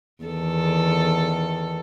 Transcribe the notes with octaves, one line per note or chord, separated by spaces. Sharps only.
E2 D#3 A4